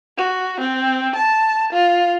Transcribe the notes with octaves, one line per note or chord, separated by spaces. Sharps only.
F#4
C4
A5
F4